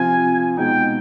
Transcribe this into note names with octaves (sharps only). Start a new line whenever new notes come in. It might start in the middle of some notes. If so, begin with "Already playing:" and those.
Already playing: C3 F3 C4 F4 G#5
B2 G#3 C4 D#4 G5